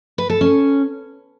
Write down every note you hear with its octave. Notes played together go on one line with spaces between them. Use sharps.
B4
A4
C#4